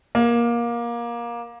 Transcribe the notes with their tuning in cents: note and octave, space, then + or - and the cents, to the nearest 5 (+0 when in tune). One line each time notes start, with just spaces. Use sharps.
A#3 +20